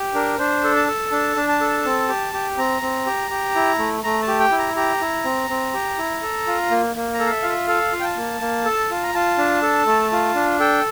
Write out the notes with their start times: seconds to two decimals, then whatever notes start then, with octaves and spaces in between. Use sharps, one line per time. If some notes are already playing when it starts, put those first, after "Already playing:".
Already playing: G4
0.14 D4 A#4
0.38 D4 C5
0.64 A4
0.76 A5
0.88 A4
1.12 D4 A5
1.36 D4
1.49 A5
1.61 A4
1.85 C4
2.09 G4
2.34 G4
2.57 C4 A#5
2.82 C4
3.06 G4
3.30 G4
3.55 E4
3.79 A3
4.04 A3 A#5
4.22 A5
4.28 G4
4.40 G5
4.52 E4
4.59 A#5
4.76 G4 A#5
5.01 E4
5.25 C4
5.50 C4
5.74 G4
5.98 E4
6.23 A4
6.47 F4
6.71 A#3
6.96 A#3
7.14 A#5
7.19 A4
7.26 F5
7.31 E5
7.43 F4 F5
7.50 E5
7.68 A4 F5
7.92 F4
8.00 G5
8.04 A5
8.17 A#3
8.41 A#3
8.65 A4
8.90 F4
9.03 A#5
9.14 F4 A5
9.38 D4
9.62 A4
9.87 A3
10.12 F4
10.35 D4
10.60 A4 G5